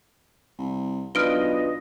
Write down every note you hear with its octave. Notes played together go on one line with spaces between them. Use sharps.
C2
B1 D4 F4 B4 D#5 F6 D7 G7